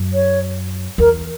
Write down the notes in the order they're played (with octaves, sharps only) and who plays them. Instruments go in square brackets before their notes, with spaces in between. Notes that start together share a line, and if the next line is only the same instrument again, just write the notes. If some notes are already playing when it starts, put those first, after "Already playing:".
Already playing: [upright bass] F#2
[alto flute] C#5
[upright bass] E2 [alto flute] A#4